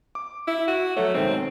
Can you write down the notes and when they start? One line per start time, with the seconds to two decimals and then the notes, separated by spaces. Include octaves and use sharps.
0.15 D6
0.47 E4
0.68 F#4
0.97 F#3 A3 A4 C#5
1.14 B1 G#2 D#3 C4